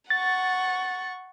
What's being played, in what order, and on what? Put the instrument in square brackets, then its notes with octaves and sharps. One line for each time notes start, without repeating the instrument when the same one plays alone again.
[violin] F#5 C#6 [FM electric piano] A6